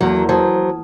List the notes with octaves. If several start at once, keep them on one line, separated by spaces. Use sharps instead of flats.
E2 F#3 A3 A#3
F#3 C5 G#5 A5 D#6